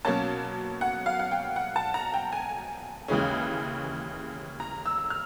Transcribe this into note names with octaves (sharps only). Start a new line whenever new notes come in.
B2 F#3 A#3 C#4 A5
F#5
F5
F#5
G5
F#5
A5
A#5
G5
G#5
D#2 C#3 E3 G#3 C#4
A#5
E6
F6